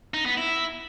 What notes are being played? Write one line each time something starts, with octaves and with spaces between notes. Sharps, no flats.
D#4
B3
E4